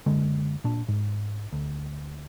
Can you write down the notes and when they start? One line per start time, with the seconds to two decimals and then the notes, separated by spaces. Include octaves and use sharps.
0.06 F#1 D3 G#3
0.64 A#2 D4
0.88 G#2
1.53 D2